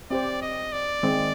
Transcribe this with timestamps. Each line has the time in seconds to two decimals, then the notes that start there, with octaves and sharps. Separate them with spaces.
0.10 C4 G4 C5 D5
0.42 D#5
0.72 D5
1.03 D#3 G#3 C4